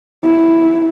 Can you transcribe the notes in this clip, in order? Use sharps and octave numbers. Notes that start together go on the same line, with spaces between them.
E4